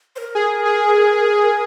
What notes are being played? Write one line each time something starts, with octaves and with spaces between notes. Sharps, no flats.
C5
A#4
G#4
G#4